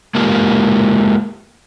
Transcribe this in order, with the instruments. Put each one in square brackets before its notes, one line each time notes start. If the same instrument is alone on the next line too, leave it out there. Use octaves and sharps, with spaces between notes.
[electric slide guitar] G#3 A#3 F4 G4 A#4